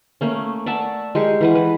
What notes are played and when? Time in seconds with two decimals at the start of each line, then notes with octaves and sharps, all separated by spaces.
0.21 A3 A#3 C#4
0.66 D5 E5 F#5 A5
1.15 G#3 G4 A#4 C#6
1.41 E3 B4 F#5
1.55 B4